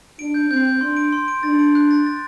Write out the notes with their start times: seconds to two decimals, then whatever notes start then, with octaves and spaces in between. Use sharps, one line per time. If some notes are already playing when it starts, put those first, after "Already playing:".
0.19 D4 D7
0.34 G6
0.50 C4 G6
0.65 G6
0.81 D4 C6
0.97 D7
1.13 C6
1.28 D7
1.43 D4 A6
1.59 D7
1.75 F#6
1.91 A6
2.06 A6